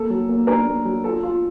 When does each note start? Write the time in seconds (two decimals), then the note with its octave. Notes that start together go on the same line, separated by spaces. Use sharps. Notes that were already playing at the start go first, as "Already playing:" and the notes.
Already playing: A#3 A4
0.10 F#3
0.29 A#3
0.47 D4 A#4
0.66 A#3
0.85 F#3
1.04 F4 A4
1.23 F4